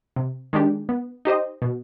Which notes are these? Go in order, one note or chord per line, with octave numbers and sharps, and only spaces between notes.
C3
D#3 G#3 D4 G4
B3
D#4 G4 C5 D#5
B2